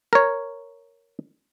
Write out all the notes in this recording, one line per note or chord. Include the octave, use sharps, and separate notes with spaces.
A#4 C#5